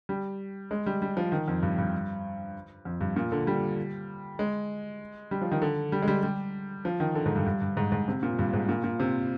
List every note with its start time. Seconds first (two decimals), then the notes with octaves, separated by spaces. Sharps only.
0.09 G3
0.71 G#3
0.86 G3
1.02 G3
1.17 F3
1.32 D#3
1.48 F2
1.63 G2
1.78 G2
2.85 F2
3.01 G2
3.16 A#2
3.32 D3
3.47 G3
4.39 G#3
5.31 G3
5.42 F3
5.52 D#3
5.62 D3
5.92 G3
6.02 G#3
6.08 G3
6.23 G3
6.85 F3
7.00 D#3
7.15 D3
7.25 G#2
7.36 G2
7.46 G2
7.62 G2
7.77 G#2
7.92 G#2
8.08 C3
8.23 A#2
8.39 G2
8.53 G#2
8.69 A#2
8.84 A#2
9.00 C3